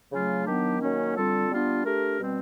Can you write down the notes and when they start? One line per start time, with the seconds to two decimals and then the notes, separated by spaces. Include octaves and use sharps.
0.11 C#3 F#3 A3 C#4 F4
0.46 D#3 F#3 B3 D4 G4
0.80 D#3 F#3 A#3 C#4
1.15 D3 G3 C4 F4 A4
1.50 G3 B3 D4 F4
1.84 A3 D4 G4 A#4
2.19 B2 G3 C4